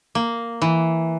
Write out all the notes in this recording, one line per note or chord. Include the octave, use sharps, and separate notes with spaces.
A#3
E3